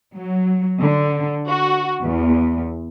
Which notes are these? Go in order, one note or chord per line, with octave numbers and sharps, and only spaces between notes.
F#3
D3
F#4
E2